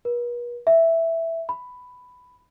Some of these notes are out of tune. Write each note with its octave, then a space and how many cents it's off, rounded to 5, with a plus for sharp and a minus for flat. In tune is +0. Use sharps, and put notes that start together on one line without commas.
B4 -45
E5 +0
B5 +10